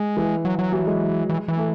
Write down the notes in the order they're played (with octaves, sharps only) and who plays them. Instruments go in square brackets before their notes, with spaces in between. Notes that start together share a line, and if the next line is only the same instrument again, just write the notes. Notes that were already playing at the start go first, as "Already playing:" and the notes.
Already playing: [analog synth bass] G#3
[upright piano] E3
[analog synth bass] F#3
F#3
[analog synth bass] E3 [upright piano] F#3
[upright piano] G#3
[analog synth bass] E3
E3
[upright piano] A3